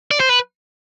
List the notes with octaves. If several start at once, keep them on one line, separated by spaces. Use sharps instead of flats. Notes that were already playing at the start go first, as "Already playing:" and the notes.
D5
C5
B4